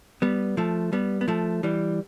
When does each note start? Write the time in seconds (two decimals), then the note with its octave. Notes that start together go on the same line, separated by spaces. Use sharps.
0.22 G3 B3
0.57 F3 A3
0.93 G3 B3
1.21 B3
1.28 F3 A3
1.63 E3 G3